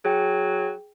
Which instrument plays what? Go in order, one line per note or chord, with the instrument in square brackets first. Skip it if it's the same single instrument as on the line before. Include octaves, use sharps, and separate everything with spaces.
[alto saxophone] F#3 [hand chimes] G#4 G5